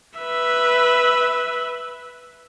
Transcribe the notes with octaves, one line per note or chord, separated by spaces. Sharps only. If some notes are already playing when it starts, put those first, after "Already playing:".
B4 E5